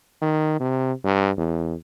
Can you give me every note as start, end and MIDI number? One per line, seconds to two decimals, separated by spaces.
0.21 0.57 51
0.60 0.92 48
1.04 1.31 43
1.37 1.75 40